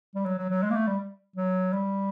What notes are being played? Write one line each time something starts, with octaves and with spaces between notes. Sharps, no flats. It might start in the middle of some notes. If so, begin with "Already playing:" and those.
G3
F#3
F#3
F#3
G#3
A#3
A3
G3
F#3
G3